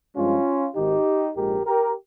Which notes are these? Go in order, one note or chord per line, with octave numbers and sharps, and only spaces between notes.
G2 F3 G#3 C#4 F4
G#1 G#2 D#3 D#4 G4
A#1 G#2 F3 G#3 G4 A#4
G4 A#4